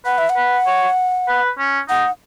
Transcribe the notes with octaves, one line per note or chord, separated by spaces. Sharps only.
B4 F#5
E5
F#5
B4
C#5
B4
C#4
D#4 F#5